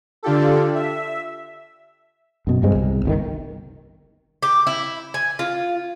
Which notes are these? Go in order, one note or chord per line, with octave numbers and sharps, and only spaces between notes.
D3 D4 F4 G4 A4
E5
F#2 B2
D2 G2 G#3 C4
C2
G1 B2 D#3
G4
E4
G#5
F4